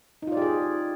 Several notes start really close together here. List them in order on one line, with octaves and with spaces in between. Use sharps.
D#4 F4 D5 G4 G#4